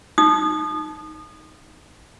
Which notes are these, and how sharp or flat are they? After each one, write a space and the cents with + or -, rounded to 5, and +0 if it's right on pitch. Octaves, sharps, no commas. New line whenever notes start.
D#4 +0 D#6 -30